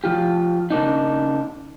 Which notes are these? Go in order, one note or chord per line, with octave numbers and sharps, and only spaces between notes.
F3 F4 G4
C#3 A#3 D4 D#4